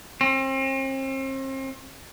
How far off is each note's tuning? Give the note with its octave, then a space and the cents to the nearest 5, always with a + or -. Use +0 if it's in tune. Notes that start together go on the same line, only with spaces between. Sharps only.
C4 +40